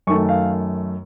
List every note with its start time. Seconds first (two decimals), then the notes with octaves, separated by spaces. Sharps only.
0.07 F#2 D#3 A3 C#6
0.29 F5